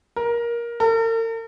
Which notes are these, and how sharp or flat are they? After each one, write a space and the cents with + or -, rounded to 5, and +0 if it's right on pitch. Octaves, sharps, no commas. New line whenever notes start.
A#4 +15
A#4 -45